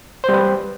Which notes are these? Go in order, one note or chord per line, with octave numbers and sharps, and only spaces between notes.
G3 B4 C5